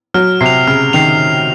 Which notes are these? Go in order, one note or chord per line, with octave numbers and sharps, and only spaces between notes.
F#3 F6
C3 C7
F7
C#3 F6
D#3 C7 F7